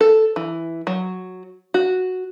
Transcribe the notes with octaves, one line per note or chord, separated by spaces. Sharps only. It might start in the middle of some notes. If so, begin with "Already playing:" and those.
A4
E3
F#3
F#4